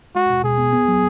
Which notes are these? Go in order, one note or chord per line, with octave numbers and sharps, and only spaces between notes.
G#3 F#4
B2
B2 G#4
B3
B3
F#3